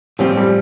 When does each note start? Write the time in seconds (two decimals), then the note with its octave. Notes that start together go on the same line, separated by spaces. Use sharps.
0.19 A2 F3 G3 C4 G4
0.37 G3